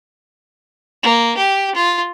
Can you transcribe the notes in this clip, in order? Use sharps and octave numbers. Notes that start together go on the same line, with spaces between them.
A#3
G4
F4